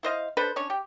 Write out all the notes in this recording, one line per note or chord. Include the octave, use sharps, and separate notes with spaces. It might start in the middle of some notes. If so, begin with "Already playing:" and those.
E4 C5 D#5 F5
D4 A4 B4 C5
C#4 D4 C#5
G4